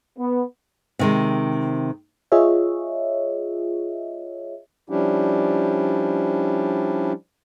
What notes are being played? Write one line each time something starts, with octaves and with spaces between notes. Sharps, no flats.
B3
C3 D#3 G#3
F4 G#4 C#5 D#5 E5
F3 G3 C#4 D4 E4 G4